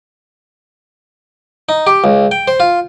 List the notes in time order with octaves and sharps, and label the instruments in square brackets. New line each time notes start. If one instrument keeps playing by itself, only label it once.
[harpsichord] D#4
G4
C#2
G5
C5
F4